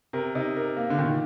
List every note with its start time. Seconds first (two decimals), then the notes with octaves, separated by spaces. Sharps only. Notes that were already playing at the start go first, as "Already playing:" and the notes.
0.13 C3 A#4
0.35 C3 D#4
0.56 A#4
0.77 A#3
0.90 D3
0.98 A#2 D#3